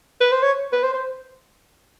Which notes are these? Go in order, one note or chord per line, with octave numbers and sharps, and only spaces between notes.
B4
C5
C#5
B4
C5
C5